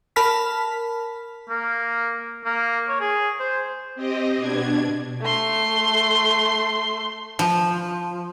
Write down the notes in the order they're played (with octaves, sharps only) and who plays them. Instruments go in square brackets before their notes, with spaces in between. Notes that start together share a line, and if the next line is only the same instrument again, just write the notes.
[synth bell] A#4 A5 B5 F6 B6
[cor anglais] A#3
A#3
C#5
G#4
C5
[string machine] C4 G4 D#5
B2 D4 G#6
[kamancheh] A3 C6
[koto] F3